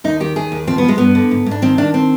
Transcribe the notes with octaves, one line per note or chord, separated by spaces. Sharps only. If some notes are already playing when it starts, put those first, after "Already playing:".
D#2 D#4
D#3 G4
D#2 G#4
D#2
F3 C4
B3
F3
G#3
G2 B3
D3
G#2
G#2 D4
D#3 C4
D#3 D4
C4